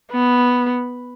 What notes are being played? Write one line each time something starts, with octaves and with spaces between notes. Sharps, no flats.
B3